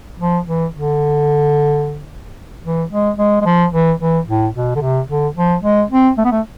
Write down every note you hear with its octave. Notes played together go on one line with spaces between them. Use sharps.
F3
E3
D3
E3
G#3
G#3
G#3
F3
E3
E3
A2
B2
D3
C3
D3
F3
G#3
C4
A3
B3
A3